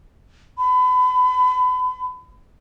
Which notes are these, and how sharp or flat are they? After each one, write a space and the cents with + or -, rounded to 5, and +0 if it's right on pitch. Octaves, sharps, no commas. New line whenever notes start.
B5 +35